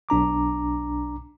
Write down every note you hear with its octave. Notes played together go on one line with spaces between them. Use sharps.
B1 D4 A#5 D6